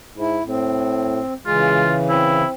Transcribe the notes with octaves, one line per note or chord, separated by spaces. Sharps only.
G#2 E4
A2 C4
C#3 E3 G#3 F4
C4 E4